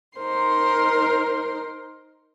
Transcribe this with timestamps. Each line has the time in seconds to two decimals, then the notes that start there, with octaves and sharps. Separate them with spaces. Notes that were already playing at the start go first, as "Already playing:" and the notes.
0.19 D#4 A#4 C5 C6